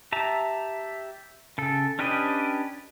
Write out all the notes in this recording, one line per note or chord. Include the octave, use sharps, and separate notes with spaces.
G4 E5 A5 A#5
C#3 A4
C#4 D4 G4 B4 D#5